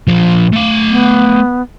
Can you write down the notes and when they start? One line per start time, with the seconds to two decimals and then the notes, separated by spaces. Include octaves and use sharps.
0.07 A#2 F3
0.52 A3 F5
0.90 B3